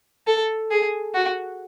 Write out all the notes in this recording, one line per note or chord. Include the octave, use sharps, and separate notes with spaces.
A4
G#4
F#4